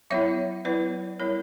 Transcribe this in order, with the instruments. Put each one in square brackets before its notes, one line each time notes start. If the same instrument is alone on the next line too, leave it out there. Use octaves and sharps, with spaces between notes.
[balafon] F#3 B3 E4 C#5 E5
F#3 B3 E4 B4 D5
G3 B3 E4 A#4 C#5